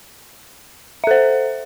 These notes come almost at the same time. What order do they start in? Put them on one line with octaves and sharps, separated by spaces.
E5 A4 C5